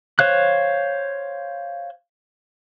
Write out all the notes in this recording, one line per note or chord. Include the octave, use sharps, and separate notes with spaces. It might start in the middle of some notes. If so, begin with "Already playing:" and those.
C5 C#5 F5 F#6